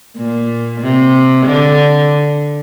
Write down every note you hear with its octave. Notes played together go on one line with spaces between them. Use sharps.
A#2
C3
D3